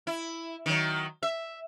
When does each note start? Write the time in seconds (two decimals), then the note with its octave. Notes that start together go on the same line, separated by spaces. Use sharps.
0.07 E4
0.66 D#3 F#3
1.23 E5